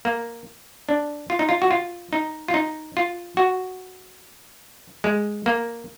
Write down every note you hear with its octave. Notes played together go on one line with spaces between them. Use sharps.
A#3
D4
F4
D#4
F4
F#4
F4
D#4
F4
D#4
F4
F#4
G#3
A#3